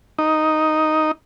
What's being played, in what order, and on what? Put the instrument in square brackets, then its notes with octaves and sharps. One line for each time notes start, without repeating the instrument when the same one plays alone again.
[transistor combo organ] D#4